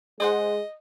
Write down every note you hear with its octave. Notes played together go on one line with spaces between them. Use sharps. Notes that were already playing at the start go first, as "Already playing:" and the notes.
G#3 G#4 C5 D#5 F#5